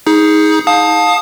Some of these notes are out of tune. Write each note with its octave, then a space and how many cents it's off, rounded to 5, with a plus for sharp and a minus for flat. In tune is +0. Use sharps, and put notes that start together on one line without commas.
D#4 +25 G#4 +0
F5 +30 A5 +0 D#6 +0